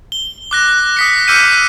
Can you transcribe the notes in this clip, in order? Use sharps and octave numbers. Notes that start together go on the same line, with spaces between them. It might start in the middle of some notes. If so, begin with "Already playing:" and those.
G7
D6 F#6 A#6
D#6 B6 C#7
D6 E6 F6 G6 C#7 D#7